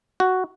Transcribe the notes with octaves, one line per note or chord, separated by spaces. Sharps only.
F#4